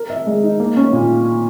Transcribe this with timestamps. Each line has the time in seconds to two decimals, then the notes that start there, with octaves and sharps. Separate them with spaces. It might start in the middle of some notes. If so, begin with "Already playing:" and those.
Already playing: A#4
0.10 E5
0.27 G#3
0.43 D#4
0.60 A#3
0.77 C#4
0.93 A#2